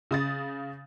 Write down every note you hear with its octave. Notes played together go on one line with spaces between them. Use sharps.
C#3 D#6 A6